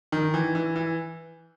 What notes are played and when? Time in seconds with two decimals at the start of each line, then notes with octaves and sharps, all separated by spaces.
0.12 D#3
0.34 E3
0.55 E3
0.76 E3